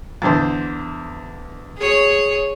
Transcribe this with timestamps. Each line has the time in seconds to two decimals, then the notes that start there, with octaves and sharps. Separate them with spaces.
0.22 E2 D3 C5
1.78 G#4 C#5